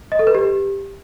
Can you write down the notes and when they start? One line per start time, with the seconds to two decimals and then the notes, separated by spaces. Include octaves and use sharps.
0.12 D#5
0.19 A4
0.27 B4
0.35 G4